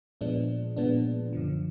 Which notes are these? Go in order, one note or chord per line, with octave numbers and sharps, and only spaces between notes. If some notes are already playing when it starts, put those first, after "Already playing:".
A#2 F3 G#3 B3 D4
A#2 F3 G#3 B3 D4
F#2 D3 F3